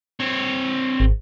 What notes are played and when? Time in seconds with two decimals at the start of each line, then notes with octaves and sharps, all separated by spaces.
0.20 C4 C#5
1.00 G#1